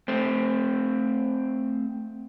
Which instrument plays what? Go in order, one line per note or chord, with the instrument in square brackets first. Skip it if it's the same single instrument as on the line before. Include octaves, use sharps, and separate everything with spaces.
[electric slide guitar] A3 C4